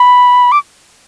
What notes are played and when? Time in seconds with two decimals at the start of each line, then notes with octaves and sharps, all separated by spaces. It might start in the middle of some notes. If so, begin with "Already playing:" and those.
Already playing: B5
0.52 D6